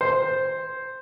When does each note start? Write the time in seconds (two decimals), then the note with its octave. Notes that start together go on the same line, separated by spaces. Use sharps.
0.01 C5